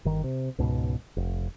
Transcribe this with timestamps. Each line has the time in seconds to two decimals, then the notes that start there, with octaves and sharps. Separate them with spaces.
0.05 G1 D#3
0.24 C3
0.58 C#2 G#2 B2
1.17 F1